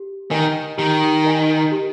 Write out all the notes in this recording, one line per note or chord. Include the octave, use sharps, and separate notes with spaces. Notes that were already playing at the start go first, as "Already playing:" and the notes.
Already playing: G4
D#3 A#4 D#5 G#5
D#3 G4
A#4 D#5 G#5
G4